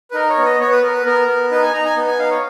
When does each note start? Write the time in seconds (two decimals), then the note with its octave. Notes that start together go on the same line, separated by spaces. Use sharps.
0.11 B4
0.14 D#4 A#4
0.30 C#5
0.38 B3
0.45 D#5
0.60 B3 C#5
0.72 B4
0.83 B3 A#4
0.94 B4
1.05 B3 A#4
1.28 B3
1.51 D#4 B4
1.62 G#5
1.73 D#4 A#5
1.85 G#5
1.97 B3
2.08 G#5
2.19 D#4 F5
2.30 C#5